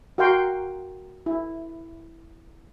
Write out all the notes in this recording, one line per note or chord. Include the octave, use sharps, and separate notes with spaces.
F#4 A#4 F5 G5 C6
E4